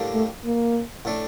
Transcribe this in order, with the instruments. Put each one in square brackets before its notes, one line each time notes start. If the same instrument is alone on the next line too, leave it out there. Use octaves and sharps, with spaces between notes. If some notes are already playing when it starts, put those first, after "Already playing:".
Already playing: [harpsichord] A2 G3 A#3 D4
[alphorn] A3
A#3
[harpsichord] A2 A3 D4